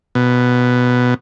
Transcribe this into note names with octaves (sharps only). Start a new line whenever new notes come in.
B2